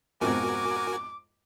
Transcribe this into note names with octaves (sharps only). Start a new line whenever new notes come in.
F2 G#2 B2 F#4 A#4 G#5 D6